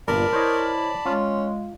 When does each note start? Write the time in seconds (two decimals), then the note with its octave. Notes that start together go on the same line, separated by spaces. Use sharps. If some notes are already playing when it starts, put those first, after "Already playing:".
0.08 G1 A#2 A#4 D5 A5 B5
0.33 E4 C5 C#5 D#5
1.06 G#3 C#4 F4